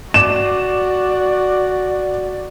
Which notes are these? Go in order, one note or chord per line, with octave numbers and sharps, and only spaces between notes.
F#4 D5 D6 E7